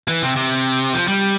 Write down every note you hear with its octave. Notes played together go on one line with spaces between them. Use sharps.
E3
C3
C3
F3
G3